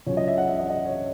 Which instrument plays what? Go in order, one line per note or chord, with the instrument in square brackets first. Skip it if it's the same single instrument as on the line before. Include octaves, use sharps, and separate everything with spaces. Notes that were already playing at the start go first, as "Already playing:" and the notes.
[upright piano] C#2 C#3 F#3 C#4 C#5
D#5
E5
F#5
E5
D#5
D#5
C#5